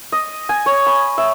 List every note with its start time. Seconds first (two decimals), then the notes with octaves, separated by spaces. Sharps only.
0.12 D#5
0.49 G#5
0.66 C#5
0.87 B5
1.18 E5